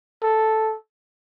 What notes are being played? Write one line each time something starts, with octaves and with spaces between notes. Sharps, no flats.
A4